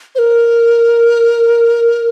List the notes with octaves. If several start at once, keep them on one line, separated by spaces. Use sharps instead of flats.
C5
A#4